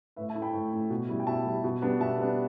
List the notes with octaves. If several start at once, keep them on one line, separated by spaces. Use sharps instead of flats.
A2 B4 E5
E5 A5
A3 E4
G5 B5
A2
A3 E4
B2
G3 E4
G5
B2 E5 A5
G3 E4
B2
G3 B3 D4
B2 E5 A5
G3 B3 D4